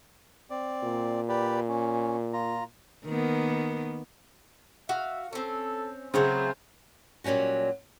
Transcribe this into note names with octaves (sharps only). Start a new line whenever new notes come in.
C4 D5
A#2
G4 B4 D5
C#4
F4 A#5
D#3 A#3 B3
F#4 E5 F5
C4 C#4 A4
C#3 F#3 A3 C4 C5
A#2 F#3 G3 C#4 F#4